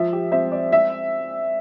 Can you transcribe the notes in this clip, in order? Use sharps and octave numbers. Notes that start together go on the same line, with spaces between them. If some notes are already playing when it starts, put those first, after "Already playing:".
Already playing: F3 E5
G4
C4 E5
D5
C4 E5